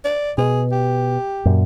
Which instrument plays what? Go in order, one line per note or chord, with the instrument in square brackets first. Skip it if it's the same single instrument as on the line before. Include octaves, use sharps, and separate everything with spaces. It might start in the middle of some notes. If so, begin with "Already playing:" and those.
[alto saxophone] D5
[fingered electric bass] B2 [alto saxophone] G#4
[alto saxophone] G4
[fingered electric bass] F#2 A#2